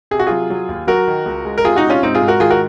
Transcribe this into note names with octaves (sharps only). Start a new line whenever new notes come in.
C3 G#4
F#4
F#3 F4 G#4
F#3
D#2
F#3 F#4 A#4
D#3
C#2
G#3
A#4
C3 F4 G#4
D#4 F#4
C3
C#4 F4
G#2 C4 D#4
F4 G#4
G#2
F#4 A#4
D#3 F4 G#4
F#4 A#4